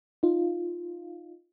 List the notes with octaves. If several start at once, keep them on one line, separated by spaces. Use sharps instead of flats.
D#4 F4